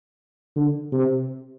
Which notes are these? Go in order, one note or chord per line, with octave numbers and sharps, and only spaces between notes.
D3
C3